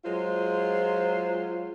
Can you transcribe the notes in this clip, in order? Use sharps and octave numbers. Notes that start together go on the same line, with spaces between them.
F#3 G#3 F4 C5